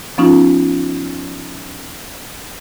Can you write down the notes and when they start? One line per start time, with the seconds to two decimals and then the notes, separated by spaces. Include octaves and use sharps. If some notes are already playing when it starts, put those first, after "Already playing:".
0.18 F3 B3 C#4 D#4 F4